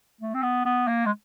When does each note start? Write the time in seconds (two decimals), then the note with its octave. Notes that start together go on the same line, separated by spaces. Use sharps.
0.21 A3
0.34 C4
0.43 B3
0.65 B3
0.88 A#3
1.06 G#3